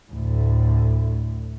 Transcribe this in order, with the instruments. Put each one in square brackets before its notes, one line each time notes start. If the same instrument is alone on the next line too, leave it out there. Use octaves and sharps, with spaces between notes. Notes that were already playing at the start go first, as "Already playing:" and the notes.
[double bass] D2 A2